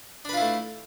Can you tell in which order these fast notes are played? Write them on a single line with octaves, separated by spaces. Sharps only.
D4 B4 F4 E4 A3